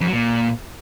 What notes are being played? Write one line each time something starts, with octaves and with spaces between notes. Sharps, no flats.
F2
F#3
A#2